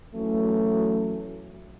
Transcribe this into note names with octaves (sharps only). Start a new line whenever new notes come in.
E3 F#3 A3 C#4